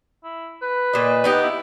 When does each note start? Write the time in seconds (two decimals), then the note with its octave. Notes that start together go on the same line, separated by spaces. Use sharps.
0.24 E4
0.62 B4
0.93 A#2 D#5
1.24 B3 D#4 G4
1.43 E4